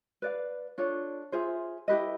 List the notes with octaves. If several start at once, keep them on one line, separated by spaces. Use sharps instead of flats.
B4 D5 F5
D4 F4 A4 C#5
F4 G#4 C5 E5
E4 G4 B4 D#5